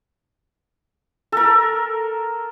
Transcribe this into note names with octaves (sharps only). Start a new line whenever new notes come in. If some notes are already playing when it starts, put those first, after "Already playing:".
A4 A#4